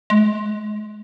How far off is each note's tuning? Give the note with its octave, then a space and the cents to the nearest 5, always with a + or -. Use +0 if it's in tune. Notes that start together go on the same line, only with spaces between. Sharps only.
G#3 +30